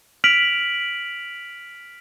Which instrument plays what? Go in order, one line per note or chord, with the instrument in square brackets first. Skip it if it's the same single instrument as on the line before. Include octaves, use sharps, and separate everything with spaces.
[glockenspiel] F6 B6 D7 F7 F#7